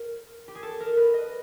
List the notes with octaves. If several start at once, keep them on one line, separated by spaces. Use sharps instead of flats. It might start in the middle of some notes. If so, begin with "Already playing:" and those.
Already playing: A#4
G4
G#4
A4
A#4
B4
D#5